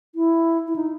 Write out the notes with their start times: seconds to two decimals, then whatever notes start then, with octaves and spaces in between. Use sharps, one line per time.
0.15 E4
0.68 E4
0.76 D#4